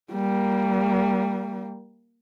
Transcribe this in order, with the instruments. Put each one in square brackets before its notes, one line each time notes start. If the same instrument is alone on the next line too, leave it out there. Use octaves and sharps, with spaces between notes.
[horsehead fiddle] G3 A#3